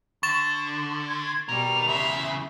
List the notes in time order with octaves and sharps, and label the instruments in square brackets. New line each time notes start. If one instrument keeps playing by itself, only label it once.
[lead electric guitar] D3 [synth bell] C#6 A6 E7
[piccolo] G#6
[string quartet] B2 G3 [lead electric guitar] D#4 A#4 [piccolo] F7
[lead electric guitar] E2 C#3 [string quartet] E5 C6